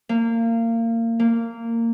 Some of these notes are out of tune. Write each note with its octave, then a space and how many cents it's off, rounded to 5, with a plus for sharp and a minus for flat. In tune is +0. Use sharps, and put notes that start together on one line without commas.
A#3 -25
A#3 -15